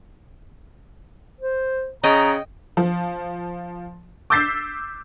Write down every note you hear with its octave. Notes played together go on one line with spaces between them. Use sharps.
C5
C#3 D#5 G5 A#5
F3
D6 E6 G6 A6 B6 C7